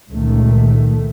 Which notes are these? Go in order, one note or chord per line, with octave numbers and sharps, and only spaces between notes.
C#2 A#2 D#3 A3